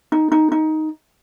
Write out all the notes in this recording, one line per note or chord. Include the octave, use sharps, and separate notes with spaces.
D#4
D#4
D#4